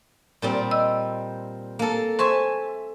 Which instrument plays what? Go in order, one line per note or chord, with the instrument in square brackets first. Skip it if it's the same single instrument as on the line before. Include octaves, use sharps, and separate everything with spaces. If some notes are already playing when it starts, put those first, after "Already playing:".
[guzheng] A#2 G3 C4
[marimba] D#5 E6
[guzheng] A#3 A4
[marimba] C5 C6 C#6 [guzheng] E5 G#5 A5